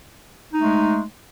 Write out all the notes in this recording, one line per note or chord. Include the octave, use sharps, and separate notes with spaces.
G#3 A3 D#4